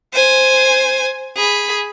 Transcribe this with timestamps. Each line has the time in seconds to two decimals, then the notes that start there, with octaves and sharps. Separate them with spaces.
0.13 C5 G#5
1.36 G#4 B5